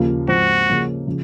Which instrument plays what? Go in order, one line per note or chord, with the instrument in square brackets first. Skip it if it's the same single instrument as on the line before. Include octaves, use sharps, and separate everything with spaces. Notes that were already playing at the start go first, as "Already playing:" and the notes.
Already playing: [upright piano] D#2 C#3 F3 A#3 F4
[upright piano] G#2 F3 C4 [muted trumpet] F#4
[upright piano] C#3 F3 A#3 C#4 G#4
C#3 F3